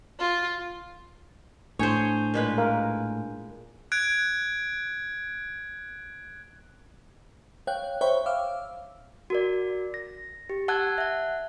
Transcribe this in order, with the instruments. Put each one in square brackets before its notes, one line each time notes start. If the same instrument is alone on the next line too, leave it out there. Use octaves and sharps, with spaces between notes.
[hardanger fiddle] F4
[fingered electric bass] A2 [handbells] D4 G#5 G6 [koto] C5 C#5 [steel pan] C#6
[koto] A#2 G#3 B4
[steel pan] A#4 F5
[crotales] F#6 G#6 D7
[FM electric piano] C#5 F5 G5 F#6
C5 C#5 E5 G5 B5 C#6
F5 D6 E6 F6
[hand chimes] F#4 A#4 D5
A#6
G4
F#5 A5 E6 F#6 G#6
E5 F#5